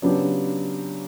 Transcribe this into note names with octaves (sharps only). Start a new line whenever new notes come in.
C#3 F#3 B3 D4 G4